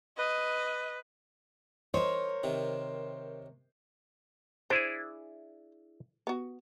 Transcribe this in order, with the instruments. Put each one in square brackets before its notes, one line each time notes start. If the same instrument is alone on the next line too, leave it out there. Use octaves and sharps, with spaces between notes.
[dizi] B4 [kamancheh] D#5
[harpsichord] D#4 [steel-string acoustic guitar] A#4 C#5 [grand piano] C5
[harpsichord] C3 D#3
[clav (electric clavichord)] D4 E4 G#4 [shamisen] C5
[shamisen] B3 F#4